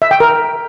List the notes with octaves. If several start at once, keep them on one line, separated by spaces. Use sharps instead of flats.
E5
G5
A#4